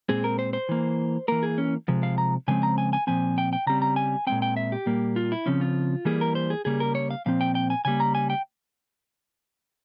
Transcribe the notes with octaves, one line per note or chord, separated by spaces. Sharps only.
A#2 G#3 C4 G#4
A#4
C5
C5
E3 A#3
E3 A#3 A#4
G#4
C#4
C3 F3 G#3
F5
A#5
C#3 F3 G#3 C4 G#5
A#5
G#5
G#5
A#2 F3 C4 G#5
G5
G5
C#3 G3 C4 A#5
A#5
G#5
A#2 G#3 C4 G5
G5
E5
G4
A#2 G3 A#3
F4
E4
C#3 F3 C4 C#4
F4
E3 G3 A#3 G#4
A#4
C5
G#4
C#3 G3 A#3 G#4
A#4
C#5
F5
A#2 F3 C4 F5
G5
G5
G#5
C#3 G3 A#3 G#5
A#5
G#5
G5